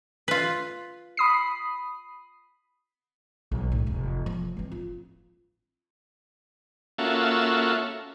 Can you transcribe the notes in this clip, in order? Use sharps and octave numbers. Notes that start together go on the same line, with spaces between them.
F4 B4
B5 D#6 C7
B1 F2
A2 D#3
F1 E2
F3
E3 C4
F4
A#3 C#4 F4 F#4 A4 E5